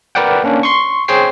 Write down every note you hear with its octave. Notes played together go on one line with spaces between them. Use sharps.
A#4 B4 D5 F#5 G5
A#3 C#4 D4
C6 C#6
G#4 C5 C#5 G5 C7